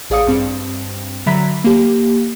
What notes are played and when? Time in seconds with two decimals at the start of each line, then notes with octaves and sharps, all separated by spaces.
0.10 A1 G#4 D5 F5 D#6 C#7
0.27 G2 C4
1.26 D3 F#3 E5 A#5 B5 B6
1.64 A#3 G4